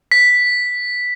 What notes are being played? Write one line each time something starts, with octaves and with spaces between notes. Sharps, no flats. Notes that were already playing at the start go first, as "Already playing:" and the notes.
B6